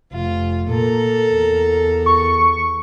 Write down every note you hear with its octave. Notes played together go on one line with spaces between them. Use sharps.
F1 F4
A#2 A4 A#4
E2
C#6